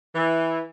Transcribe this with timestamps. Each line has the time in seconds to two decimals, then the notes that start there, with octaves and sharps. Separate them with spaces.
0.15 E3